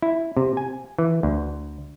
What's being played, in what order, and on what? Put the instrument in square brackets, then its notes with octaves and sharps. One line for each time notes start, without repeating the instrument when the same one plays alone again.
[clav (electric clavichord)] E4
C3
G#5
E3
D2